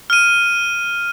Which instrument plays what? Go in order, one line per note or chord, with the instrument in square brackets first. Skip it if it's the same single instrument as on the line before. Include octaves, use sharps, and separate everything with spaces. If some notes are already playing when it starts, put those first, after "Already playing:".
[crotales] F6 D#7